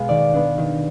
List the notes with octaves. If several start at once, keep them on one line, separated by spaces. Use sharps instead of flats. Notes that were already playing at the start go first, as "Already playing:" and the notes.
Already playing: B2 G#3 B3 F5
D#3 D5
B3 D4
D#3